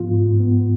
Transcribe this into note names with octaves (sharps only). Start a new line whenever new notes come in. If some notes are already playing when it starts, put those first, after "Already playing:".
Already playing: G#2 F3 B3 F4
G#2
B3